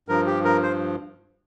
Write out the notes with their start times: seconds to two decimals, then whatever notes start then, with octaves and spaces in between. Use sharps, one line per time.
0.08 G2 F3 A#4
0.26 G4
0.44 A#4
0.63 C5